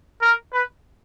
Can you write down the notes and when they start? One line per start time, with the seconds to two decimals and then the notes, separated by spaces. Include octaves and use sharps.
0.22 A#4
0.52 B4